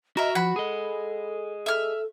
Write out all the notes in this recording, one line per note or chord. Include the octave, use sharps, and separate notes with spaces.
F#4 A#4 D#5 E5
F3 F#5 B5
G#4 A4 D#5
A4 E5 F6